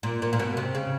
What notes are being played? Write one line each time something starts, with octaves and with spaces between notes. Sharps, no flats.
A#2
A#2
A#2
B2
C3
C#3